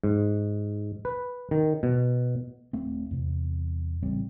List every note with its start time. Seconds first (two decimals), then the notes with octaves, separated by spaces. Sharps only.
0.04 G#2
1.05 B4
1.51 D#3
1.83 B2
2.73 D#1 A3 C4
3.11 E2 C3
4.02 A1 C#3 G3 C4